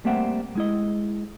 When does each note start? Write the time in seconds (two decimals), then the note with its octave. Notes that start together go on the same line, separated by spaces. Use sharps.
0.05 G3 A3 A#3 C4 E5 F#5
0.55 G#3 E4 D#5